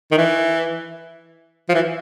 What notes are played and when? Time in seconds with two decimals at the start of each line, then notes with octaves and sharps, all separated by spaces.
0.11 D#3
0.18 E3
1.69 F3
1.74 E3